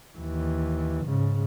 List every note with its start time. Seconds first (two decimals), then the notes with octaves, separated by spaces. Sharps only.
0.18 D#2 E3
1.05 G#2 C#3